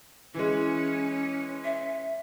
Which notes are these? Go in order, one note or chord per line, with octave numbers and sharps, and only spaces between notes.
E3 G#3 C#4
E5